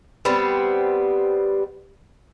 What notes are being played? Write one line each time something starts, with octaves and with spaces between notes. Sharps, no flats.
G3 B3 C4